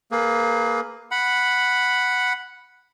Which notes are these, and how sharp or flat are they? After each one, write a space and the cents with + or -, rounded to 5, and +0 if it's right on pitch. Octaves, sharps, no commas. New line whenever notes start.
A#3 +0 G#4 +35 B4 +0
F#5 +0 B5 +0